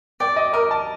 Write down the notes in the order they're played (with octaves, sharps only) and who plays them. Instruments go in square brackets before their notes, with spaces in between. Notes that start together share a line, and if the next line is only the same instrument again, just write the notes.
[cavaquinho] D5 [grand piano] G5
[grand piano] D#5
[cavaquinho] A#4 [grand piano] D#5
[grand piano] A5